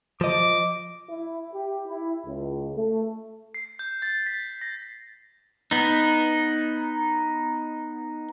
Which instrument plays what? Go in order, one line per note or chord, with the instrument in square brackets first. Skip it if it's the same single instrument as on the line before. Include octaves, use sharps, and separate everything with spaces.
[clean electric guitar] F3 D#5 [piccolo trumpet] D6
[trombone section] E4
G4
E4
C#2
A3
[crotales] C7
G6
A6
B6
A#6
[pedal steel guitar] B3 D#4